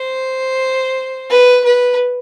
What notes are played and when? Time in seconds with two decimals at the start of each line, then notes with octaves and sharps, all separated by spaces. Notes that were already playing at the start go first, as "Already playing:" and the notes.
Already playing: C5
1.30 B4
1.64 B4